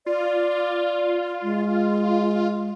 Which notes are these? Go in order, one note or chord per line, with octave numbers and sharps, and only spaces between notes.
F4 D5
G#3